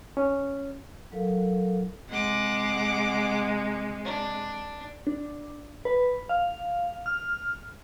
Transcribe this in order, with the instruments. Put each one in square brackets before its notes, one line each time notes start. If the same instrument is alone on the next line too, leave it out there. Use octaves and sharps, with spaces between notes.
[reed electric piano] C#4
[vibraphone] F#3 E4 A4 A#4 F5
[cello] C3 G#3 [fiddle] F#5 D6
[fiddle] D4
[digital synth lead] D4
B4
F5
F6